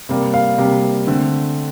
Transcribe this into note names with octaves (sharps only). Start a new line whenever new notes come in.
C3 G3 A#3
F5
C3 G3 A#3
D3 A3 C4